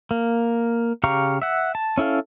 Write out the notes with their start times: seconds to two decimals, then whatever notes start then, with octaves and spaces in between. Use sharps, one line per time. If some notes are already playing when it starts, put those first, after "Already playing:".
0.11 A#3
1.04 C#3 G4 F5 A#5 C#6
1.42 E5 F#5
1.75 A5
1.98 C#4 E4 A4 F5